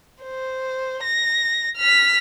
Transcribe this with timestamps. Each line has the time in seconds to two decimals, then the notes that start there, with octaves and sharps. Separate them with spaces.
0.23 C5
1.04 A#6
1.77 F6 B6